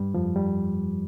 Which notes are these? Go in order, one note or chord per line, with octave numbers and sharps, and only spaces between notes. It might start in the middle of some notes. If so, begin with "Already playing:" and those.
Already playing: G2 G3
F2 F3
G3